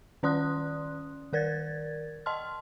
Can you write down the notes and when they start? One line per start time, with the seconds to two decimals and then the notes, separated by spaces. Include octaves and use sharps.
0.23 D#3 C#4 D5 C6 D#6 F#6
1.33 D#3 A#4 D5 G#6 A6
2.26 D#5 A5 C6 F6